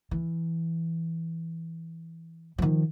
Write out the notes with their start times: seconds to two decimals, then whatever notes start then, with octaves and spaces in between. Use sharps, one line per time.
0.11 E3
2.58 D#3 F3